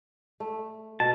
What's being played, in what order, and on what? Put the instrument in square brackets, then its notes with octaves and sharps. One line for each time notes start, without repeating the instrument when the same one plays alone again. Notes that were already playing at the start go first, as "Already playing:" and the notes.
[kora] A3
[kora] B2 [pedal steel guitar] A5